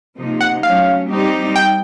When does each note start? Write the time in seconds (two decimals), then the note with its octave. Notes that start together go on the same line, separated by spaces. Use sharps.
0.17 C3 F3 A#3 D#4
0.41 F#5
0.63 F#3 A3 C#4 F5
1.10 G3 C4 D#4 G4
1.56 G5